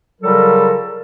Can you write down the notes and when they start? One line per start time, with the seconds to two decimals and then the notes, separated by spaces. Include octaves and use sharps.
0.22 C#3 F#3 G3 F4 A4 A#4